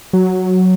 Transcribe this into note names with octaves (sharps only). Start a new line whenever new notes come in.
F#3